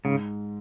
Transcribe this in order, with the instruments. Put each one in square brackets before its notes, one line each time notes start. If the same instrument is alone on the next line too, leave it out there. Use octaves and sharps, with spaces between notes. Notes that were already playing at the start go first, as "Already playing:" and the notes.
[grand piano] G#2 [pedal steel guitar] C#3